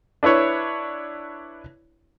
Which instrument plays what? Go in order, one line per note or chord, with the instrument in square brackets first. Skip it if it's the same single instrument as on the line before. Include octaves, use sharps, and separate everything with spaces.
[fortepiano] D4 E4 B4 C#5